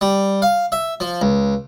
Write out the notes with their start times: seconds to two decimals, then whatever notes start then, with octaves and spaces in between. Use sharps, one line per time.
0.01 G3
0.42 F5
0.72 E5
1.00 F3
1.21 C#2